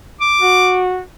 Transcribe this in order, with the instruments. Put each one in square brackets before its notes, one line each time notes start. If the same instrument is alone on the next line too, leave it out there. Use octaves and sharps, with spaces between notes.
[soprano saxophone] D6
[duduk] F#4